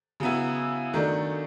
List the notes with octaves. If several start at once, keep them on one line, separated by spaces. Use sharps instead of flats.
C#3 F#3 B3 E4
D#3 F#3 A3 D4